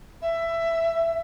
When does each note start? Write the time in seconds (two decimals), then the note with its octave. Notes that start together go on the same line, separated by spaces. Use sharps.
0.22 E5